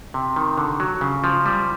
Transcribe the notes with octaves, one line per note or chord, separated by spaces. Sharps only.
C3
D#3
D3
F#3
C#3
F3
G3